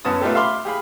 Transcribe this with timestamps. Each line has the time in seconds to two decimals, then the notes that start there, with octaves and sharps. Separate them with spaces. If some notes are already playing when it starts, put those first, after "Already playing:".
0.05 F#2 B3 C#4 A5 D#6
0.21 A3 B3 D#4 F4 G4 A4
0.34 E5 F5 B5 C6 D6
0.65 G4 G#4 F5 B5